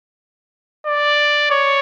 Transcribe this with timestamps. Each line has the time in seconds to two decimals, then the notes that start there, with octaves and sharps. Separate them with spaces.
0.86 D5
1.51 C#5